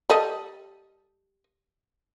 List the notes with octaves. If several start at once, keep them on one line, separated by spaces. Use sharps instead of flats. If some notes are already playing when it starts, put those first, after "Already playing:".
G3 A4 D#5